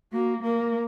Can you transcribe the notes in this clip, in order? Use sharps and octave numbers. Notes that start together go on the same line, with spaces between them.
A#3 F#4
A#3 A#4